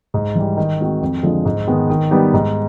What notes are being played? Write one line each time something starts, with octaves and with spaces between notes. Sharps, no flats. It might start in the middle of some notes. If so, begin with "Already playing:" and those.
G#2
E3 G3
D#3
G#3 C4 D#4 F#4
F2
D3 F3 G#3
G#2
D#3 G#3 B3
D#3
G3 B3 D#4 G4
G#2